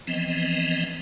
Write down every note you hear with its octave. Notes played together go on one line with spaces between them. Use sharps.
E3 F3 B3 C4 D#5